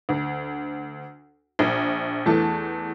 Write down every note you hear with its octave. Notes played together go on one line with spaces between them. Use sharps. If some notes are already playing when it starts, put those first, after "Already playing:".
D2
A#1
E2 E3 A3 A5